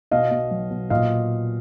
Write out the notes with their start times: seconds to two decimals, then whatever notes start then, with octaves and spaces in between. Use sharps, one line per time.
0.11 B2 D#5 F5
0.31 B2
0.51 F#3
0.71 B2
0.90 A#2 D#5 F5